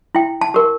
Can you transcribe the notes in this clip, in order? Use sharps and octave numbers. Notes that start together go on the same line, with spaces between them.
E4 G5
A5
G4 A#4